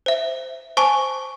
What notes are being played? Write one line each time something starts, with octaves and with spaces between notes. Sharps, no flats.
C5 E5
C5 G#5 A5 C#6 D6